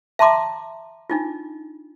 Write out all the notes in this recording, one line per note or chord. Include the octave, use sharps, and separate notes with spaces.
E5 A5 A#5 C6 D6
D4 D#4 F4